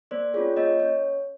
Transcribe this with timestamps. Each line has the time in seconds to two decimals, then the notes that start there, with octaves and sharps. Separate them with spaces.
0.11 A#3 C5 D5
0.34 C#4 F4 G#4 C#5
0.56 A#3 C#5 D#5
0.80 C#4 C#5